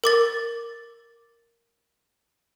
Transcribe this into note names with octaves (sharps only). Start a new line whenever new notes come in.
A#4 D6 A6